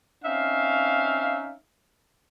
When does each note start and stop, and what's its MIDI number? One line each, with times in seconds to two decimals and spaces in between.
0.24 1.55 60
0.24 1.55 61
0.24 1.55 63
0.24 1.55 76
0.24 1.55 77